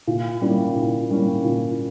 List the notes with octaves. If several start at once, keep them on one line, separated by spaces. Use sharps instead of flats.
A#2
G3 A#3 C#4 E4
A#2
G3 A#3 C#4 E4
A#2